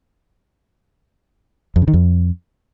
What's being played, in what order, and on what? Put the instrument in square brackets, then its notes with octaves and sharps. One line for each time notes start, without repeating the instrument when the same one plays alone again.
[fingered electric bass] F2
C#3
D#3
F2